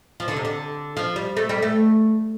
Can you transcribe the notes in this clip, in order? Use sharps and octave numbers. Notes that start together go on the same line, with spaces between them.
F3
D3
C3
D3
F3
G3
A3
G3
A3